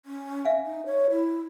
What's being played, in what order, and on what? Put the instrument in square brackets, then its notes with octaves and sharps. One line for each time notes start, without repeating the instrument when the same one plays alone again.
[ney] C#4
[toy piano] E5 F5 G#5
[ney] D#4
C#5
E4